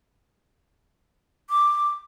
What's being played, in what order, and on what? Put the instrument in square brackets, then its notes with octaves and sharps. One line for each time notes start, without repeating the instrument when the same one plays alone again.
[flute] D6